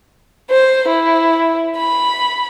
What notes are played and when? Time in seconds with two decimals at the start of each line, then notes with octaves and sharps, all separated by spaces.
0.50 C5
0.89 E4
1.78 B5